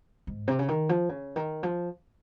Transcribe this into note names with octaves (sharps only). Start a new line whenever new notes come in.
G#2
C3
C#3
D#3
F3
C#3
D#3
F3